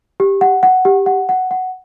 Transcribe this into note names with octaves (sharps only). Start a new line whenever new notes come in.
G4
F#5
F#5
G4
F#5
F#5
F#5